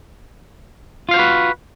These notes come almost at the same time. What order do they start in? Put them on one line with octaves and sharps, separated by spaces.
F4 F5 C5 F#4 B4